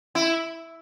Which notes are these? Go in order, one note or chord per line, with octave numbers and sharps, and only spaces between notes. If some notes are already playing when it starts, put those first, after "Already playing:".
E4